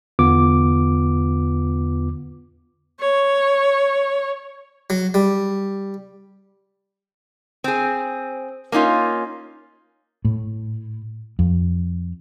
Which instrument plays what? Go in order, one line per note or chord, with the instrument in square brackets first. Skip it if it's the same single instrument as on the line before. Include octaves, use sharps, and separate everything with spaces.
[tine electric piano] E2 D3 B3 F4 D6
[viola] C#5
[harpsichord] F#3
G3
[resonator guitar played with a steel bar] C4 G#4
A#3 C#4 D#4 F4
[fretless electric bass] A2
F2